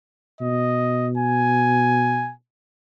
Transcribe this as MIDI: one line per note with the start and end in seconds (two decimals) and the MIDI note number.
0.41 2.32 47
0.41 1.08 75
1.18 2.32 80